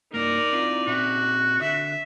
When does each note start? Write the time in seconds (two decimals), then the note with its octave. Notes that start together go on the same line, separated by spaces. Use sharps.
0.14 G2 A#3 D#4 A#4 D5
0.53 C4 E4 F4
0.87 A#2 C4 F#4 E5
1.61 D3 E5